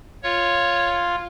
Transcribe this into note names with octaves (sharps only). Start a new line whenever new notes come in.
F4 C#5